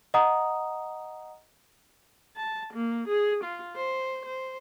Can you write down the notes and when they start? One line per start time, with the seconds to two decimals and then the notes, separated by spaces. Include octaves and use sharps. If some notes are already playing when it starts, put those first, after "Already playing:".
0.14 D#5 F#5 A#5 D#6
2.37 A5
2.73 A#3
3.08 G#4
3.44 F4
3.76 C5
4.25 C5